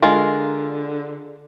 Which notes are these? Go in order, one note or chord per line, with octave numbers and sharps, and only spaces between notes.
D3 G#3 F4 A#4